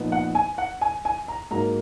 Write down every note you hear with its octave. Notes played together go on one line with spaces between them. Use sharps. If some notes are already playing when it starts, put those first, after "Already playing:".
Already playing: A#2 F3 B3 D#4
F#5
G#5
F#5
G#5
G#5
A#5
G#2 F#3 A#3 A#5